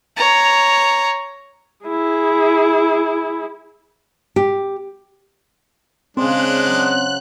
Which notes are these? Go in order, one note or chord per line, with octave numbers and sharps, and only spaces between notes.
C#5 A#5
E4 G#4
G4
C#3 G#3 C4 D4 C5 F#6
F#3